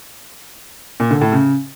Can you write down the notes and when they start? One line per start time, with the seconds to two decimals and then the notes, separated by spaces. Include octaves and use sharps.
1.00 A#2
1.11 D3
1.21 A2
1.32 C#3